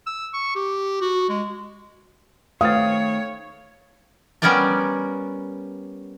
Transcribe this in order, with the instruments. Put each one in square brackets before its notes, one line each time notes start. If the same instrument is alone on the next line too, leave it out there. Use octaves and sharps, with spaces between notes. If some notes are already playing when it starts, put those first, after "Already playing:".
[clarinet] E6
C#6
G4
F#4
G#3
[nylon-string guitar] D#3 A3 C4 [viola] C#5 [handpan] F5 [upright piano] D#6 A6
[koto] G3 B3 C#4 A#4 D5 A#5